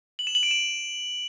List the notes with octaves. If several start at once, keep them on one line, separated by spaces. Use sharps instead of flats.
F#7
E7
F#7
D7
E7